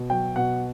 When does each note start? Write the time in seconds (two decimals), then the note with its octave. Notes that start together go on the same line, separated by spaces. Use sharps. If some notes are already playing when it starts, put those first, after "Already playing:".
Already playing: B2
0.10 F#3 G5
0.36 B2 F#5